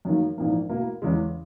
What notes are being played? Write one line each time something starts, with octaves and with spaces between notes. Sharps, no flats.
F#2 D#3 A#3
A#1 G#2 E3 A#3
B2 A#3 E4
E2 C#3 E3 G#3